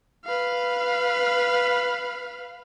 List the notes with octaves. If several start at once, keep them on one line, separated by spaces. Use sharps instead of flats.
B4 F5